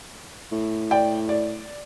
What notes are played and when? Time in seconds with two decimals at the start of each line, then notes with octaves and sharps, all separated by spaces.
0.52 A2
0.91 D5 G5
1.29 D5